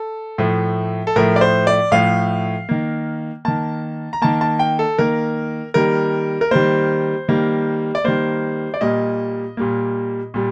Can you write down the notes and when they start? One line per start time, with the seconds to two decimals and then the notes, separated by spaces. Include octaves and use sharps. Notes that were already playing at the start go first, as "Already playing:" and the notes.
Already playing: A4
0.38 A2 F3 A3
1.07 A4
1.16 A2 F3 A3 A#4
1.36 D5
1.41 C5
1.67 D5
1.91 A2 F3 A3 F5
2.69 D#3 A#3
3.45 D#3 A#3 A5
4.13 A#5
4.22 D#3 A#3 A5
4.41 A5
4.59 G5
4.79 A4
4.98 D#3 A#3 A#4
5.74 D#3 G3 A#3 A#4
6.41 A#4
6.51 D#3 G3 A#3 C5
7.28 D#3 G3 A#3
7.95 D5
8.04 D#3 G3 A#3 C5
8.74 D5
8.81 A#2 G3 A#3 D#5
9.57 A#2 G3 A#3
10.34 A#2 G3